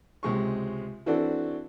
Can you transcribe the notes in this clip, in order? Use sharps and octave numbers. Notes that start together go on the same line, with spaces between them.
C#2 C3 G#3 C#6
E3 C4 D4 F#4 A4 D5